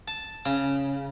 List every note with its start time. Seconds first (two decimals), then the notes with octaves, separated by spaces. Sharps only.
0.07 A5
0.45 C#3